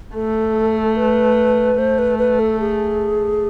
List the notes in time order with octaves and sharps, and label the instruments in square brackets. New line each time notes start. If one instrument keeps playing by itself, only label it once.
[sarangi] A3 [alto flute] A4
[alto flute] B4
[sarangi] A3 [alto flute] C5
[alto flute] B4
B4
A4
G#4